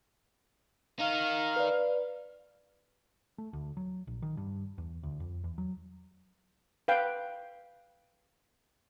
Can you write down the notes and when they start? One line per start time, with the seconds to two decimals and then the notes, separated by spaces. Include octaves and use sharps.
0.99 D#4 A#4 F5
1.56 B4 D5
3.38 A3
3.53 D2
3.77 F#3
4.07 A#1
4.22 D#3
4.37 G2
4.78 E2
5.03 D2
5.20 F2
5.44 E2
5.58 F#3
6.88 B4 F5 G5